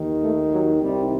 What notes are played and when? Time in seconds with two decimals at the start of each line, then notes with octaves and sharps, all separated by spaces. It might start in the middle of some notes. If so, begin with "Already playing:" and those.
Already playing: D#2 D#3
0.23 A3
0.52 F#3
0.81 C2 C3 D#3 G3